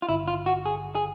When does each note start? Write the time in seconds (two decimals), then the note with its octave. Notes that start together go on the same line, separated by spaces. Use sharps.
0.02 F4
0.08 G#1 G2 D3 E4
0.28 F4
0.46 F#4
0.66 G#4
0.95 G#4